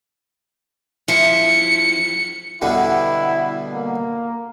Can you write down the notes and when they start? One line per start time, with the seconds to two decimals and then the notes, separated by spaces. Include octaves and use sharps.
1.08 F3 E4 C#7
2.62 B2 D3 G3 E4
3.74 A#3